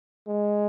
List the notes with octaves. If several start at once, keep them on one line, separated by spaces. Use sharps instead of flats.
G#3